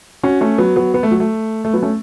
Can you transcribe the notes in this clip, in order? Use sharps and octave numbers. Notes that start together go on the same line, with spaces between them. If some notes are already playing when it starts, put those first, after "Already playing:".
C#4 F#4
A3 C#4
F#3 B3
F#3 B3
B3
A3
F#3
A3
A3
F#3 B3
A3 C#4